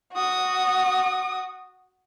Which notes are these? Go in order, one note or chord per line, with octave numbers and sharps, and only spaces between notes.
F#4 D#6